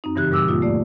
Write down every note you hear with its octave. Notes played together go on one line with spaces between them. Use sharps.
F#2 C4 D#4
G2 C#3 E3 G4 F#6
A#2 G3 D6 E6
D#2 A#3 F4 D#6
A3 D5